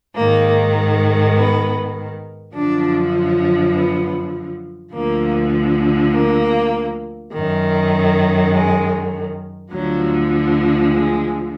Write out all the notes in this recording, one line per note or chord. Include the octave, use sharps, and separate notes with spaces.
G#2 D#3 A#3
B3
F#2 D3 F3 D4
B3
D2 D3 F3 A#3
A#3
F#2 D#3
G#3
D2 D3 F3 F#3
G#3